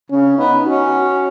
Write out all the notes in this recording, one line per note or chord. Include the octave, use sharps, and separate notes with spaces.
C#3 C#4
B3 D#4
C#4 F#4